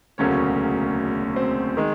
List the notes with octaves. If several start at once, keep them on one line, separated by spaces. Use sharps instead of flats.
E1 D2 C#3 F#3 A#3 C#4 C#5
C4 C5
D#3 G#3